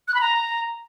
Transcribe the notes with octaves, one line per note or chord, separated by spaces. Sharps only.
F#6
B5
A#5